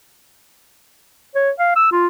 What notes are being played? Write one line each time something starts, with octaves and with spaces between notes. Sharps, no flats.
C#5
F5
E6
F4